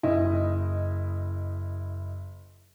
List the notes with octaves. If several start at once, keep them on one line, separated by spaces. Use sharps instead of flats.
F#1 E4 D#5